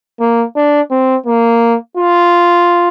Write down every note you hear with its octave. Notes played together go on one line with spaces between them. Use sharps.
A#3
D4
C4
A#3
F4